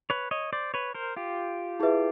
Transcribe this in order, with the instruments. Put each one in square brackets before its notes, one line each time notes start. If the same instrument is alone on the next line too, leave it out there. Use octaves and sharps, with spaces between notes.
[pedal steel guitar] B4 C#5
C#5 D#5
C5 D5
B4 C#5
A#4 C5
F4 G4
[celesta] E4 G#4 B4 E5